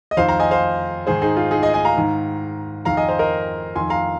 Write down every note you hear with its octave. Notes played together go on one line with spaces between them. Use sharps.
D#5
F2 D#3 C5 F5
F5 A#5
D#5 G#5
C5 F5
G#2 D#3 G#4 C5
D#4 G#4
F4
D#4 G#4
D#5 G#5
D#5 G#5
F5 A#5
G#2 D#3
F2 D#3 F5 A#5
D#5 G#5
C5 F5
A#4 D#5
F2 D#3 G#5 C6
F5 A#5